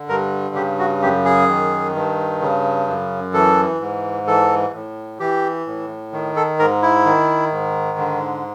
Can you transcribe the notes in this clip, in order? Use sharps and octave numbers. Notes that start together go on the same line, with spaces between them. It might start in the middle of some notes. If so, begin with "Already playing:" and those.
Already playing: D3
G2 A#4
C#3 G4
F#4
F#2 G4
G#4
D#3
G2
C#3
F#2
E3 A4
G#2
E3 A4
A2
E3 G4
A2
D#3
A4
G#2 A#4
E4
D#3
G#2
D3